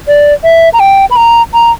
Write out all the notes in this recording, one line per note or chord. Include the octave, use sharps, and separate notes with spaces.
D5
E5
A#5
G5
B5
A#5
A#5